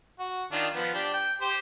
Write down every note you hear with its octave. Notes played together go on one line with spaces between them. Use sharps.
F#4
D#3 D4 F4
F3 B3
D4 G4
G5
G4 C5